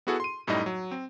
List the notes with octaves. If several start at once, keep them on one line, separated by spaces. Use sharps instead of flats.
B3 E4 F#4 G#4 A4 F#5
C6 D#7
F#2 A2 G3 D#4 E4 D#5
F#3
C4